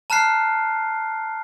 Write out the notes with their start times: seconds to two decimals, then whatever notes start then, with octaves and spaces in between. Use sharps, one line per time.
0.10 A5 A#5 F6 F#6 C7